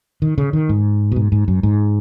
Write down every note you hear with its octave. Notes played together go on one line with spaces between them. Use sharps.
D#3
C#3
D#3
G#2
B2
G#2
G#2
F#2
G#2